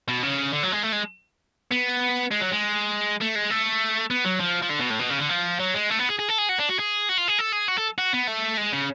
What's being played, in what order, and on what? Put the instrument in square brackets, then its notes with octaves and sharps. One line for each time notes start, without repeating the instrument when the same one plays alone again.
[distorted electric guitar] B2
C#3
D3
F#3
G#3
A3
G#3
B3
G#3
F#3
G#3
A3
G#3
A3
B3
F#3
F3
F3
D3
B2
A2
B2
C#3
D3
F3
F#3
G#3
A3
B3
G#4
G#4
A4
G#4
F#4
D4
F#4
G#4
F#4
F4
G#4
A4
G#4
F#4
A4
F#4
B3
A3
G#3
C#3